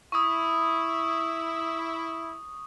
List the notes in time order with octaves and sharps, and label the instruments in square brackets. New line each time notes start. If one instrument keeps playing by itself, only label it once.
[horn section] E4 [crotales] C#6 D#6